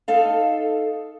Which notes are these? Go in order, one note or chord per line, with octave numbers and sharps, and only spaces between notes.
D#4 A4 F5